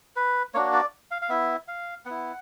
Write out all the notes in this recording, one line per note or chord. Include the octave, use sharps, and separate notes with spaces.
B4
A#3 D4 F#4 C#5
D5
F5
F5
B3 E4 E5
F5
B3 E4 F#5